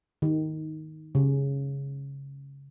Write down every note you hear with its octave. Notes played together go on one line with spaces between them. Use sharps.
D#3
C#3